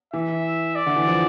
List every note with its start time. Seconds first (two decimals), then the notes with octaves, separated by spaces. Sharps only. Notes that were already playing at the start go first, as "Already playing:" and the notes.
0.14 E3 E5
0.76 D5
0.86 D3
0.96 E3
1.07 F3